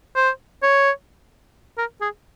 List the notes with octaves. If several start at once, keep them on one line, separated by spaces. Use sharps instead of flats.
C5
C#5
A#4
G#4